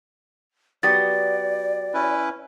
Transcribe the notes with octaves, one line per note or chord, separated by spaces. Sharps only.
F#3 B3 G4 D5 A6
C#4 E4 B4